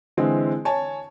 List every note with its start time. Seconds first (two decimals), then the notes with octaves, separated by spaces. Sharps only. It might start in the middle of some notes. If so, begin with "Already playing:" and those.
0.17 D3 E3 G#3 C4
0.65 C#5 G#5 A5